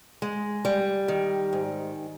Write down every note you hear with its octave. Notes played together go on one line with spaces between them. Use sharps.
G#3
G3
D#3
G#2